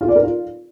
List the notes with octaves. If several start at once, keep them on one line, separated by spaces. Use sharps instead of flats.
F4
D5
A#4
F4